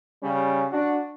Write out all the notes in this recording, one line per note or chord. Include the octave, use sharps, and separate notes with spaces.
C#3 G3 C#4
D4 F#4